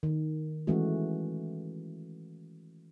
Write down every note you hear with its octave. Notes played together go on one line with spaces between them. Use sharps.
D#3
E3 G#3 A3 C#4 F#4